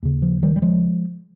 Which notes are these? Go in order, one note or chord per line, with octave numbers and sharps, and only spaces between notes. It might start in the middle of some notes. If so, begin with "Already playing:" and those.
D#2 C#3
F3
D#3 G3
G3
F3 G#3